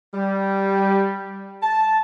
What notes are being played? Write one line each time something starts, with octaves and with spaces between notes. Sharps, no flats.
G3
A5